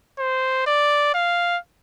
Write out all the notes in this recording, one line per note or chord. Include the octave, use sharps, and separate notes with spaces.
C5
D5
F5